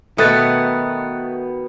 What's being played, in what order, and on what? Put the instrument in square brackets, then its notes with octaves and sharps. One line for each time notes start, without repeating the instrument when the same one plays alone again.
[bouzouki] B2 D#3 B3 [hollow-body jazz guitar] A3 [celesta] D#6 F#6 A6